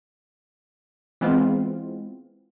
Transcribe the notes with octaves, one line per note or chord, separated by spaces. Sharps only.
E3 G#3 B3 C4 F4